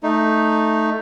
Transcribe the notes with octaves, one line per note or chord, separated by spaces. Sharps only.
A3 D#4